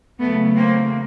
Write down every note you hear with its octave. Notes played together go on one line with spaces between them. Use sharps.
E2 C#3 F#3 A3 B3
A#3 C4